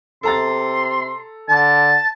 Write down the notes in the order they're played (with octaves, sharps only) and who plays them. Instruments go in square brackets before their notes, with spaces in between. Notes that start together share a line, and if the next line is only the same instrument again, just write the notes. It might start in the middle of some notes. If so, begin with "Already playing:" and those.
[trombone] C3 [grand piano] A4 A#5 A6 [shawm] C6
[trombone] D3 [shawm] A5